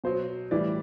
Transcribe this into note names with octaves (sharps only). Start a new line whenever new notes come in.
B2 F#3 C5
A2 E3 G3 D5